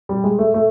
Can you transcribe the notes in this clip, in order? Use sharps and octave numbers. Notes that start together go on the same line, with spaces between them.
G3
G#3
A3
A3